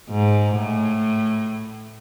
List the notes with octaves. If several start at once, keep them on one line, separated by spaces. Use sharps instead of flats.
G#2
A2